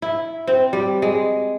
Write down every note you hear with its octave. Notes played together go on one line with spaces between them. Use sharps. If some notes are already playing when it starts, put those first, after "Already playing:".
E4
C4
G3
G#3